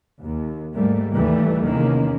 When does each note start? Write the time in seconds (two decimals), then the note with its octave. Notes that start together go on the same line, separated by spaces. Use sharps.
0.23 D#2
0.74 G#2 G3 A3 A#3
1.15 D#2 E3 G3 A3
1.66 E2 C3 D#3 A#3 C#4